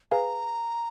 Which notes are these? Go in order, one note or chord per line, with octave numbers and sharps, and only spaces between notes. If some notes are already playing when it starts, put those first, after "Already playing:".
G#4 B4 F5 G#5 A#5